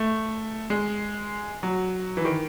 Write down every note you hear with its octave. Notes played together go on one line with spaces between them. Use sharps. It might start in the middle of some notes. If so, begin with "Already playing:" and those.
Already playing: A3
G#3
F#3
E3
D#3